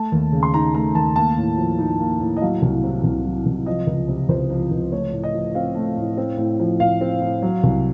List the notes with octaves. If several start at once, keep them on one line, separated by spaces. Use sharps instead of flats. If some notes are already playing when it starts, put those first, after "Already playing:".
Already playing: A3 A5
D#2
C#3
C6
D#4 A#5
A3 A#5
D#2 A5
A#3 A5
A2
F3
D#4
A#3
A2
D#5
F#3 F5
C2
C3
C2
F#3
C2
F3 D#5
C#2
C3
C#2 C5
F3
C#2
A3 C#5
A2
D#5
F3
C4 F5
A3
A2
C4
A2
F3
A2 F5
C4
A2
F#3
C2